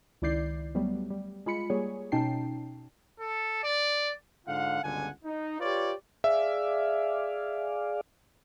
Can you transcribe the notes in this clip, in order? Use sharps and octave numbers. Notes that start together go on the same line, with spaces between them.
C#2 D#3 E4 D5 G6 C7
F#3 G3 A3 B3
G3
G#3 F4 B5 C#7
G3 A#3 G#4 C#5
B2 C#4 D#4 G5 A5 C7
A4
D5
G#2 D3 F4 F5 F#5
G1 C#2 B2 D3 F#5 G#5
D#4
F4 G4 B4 C#5 D5
G#4 D5 E5 F5